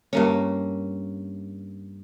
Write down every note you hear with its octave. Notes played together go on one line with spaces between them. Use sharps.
G2 A#3 C#4